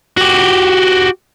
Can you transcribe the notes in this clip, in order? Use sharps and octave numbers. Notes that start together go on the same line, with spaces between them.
F#4 G4